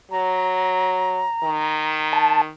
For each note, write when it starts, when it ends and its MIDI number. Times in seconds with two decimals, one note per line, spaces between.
0.12 1.24 54
0.12 2.17 82
1.44 2.50 51
2.13 2.42 81